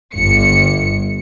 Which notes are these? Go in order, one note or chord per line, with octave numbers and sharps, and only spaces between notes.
G1 C#7